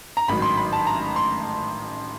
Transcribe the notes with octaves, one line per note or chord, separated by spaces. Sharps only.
A#5
A1 G#2 D#3 F#3 B5
C6
B5
A5
A#5
C6